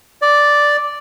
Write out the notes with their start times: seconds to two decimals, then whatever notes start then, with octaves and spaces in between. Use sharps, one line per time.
0.22 D5